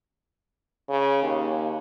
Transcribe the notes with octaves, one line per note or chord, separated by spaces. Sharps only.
C#3
D#2